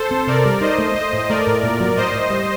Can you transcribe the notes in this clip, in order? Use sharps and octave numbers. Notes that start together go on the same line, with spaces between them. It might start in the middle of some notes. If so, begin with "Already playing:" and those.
Already playing: A4 C5
C4
C3 A#4 D5
G3
D#4 C5 D#5
A3
A3 C5 D#5
A2
A3 A#4 D5
A2
A#2
F#3
A2 C5 D#5
A2
G3